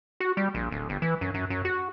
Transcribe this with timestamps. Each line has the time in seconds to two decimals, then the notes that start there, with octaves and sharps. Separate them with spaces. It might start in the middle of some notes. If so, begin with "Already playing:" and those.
0.20 F#4
0.37 G3
0.55 A#1
0.71 D1
0.89 G1
1.02 E3
1.21 F#2
1.34 F#2
1.50 F#2
1.65 F#4